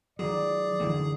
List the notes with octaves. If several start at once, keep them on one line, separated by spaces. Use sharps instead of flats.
D#3 F#3 G#4 D5
D3 E3 A3